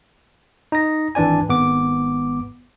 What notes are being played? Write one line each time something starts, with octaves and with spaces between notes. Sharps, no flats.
D#4 A#6
G#1 E3 D4 D5 G#5
G#1 B3 D6